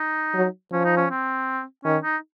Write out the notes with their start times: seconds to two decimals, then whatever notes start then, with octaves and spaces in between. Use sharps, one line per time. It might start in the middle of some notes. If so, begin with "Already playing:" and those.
Already playing: D#4
0.35 F#3
0.72 F3 C#4
0.84 D#4
0.97 C#4
1.10 C4
1.84 D#3 C#4
2.03 D#4